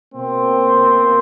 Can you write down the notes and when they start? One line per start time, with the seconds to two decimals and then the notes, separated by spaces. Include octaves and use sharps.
0.14 B2 A#3 C4